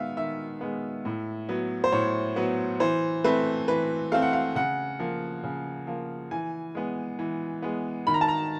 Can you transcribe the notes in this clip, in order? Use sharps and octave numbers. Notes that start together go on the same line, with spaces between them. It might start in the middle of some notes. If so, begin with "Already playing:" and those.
Already playing: D#3 G#3 B3 E5 F5
D#3 E5
G#3 B3
A2
F#3 B3
C5
A2 C#5
F#3 B3
E3 C5
A3 C4 B4
E3 B4
A3 C4 F5
F#5
F5
C#3 F#5
F3 A#3
C#3
F3 A#3
E3 G#5
G#3 B3
E3
G#3 B3
D#3 B5
A#5
A5
A#5